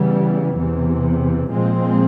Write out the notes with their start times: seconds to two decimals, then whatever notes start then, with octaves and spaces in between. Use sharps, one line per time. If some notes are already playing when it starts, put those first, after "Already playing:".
Already playing: C#3 E3 G3 B3
0.55 E2 C3 E3
1.50 A#2 F3 G#3 C4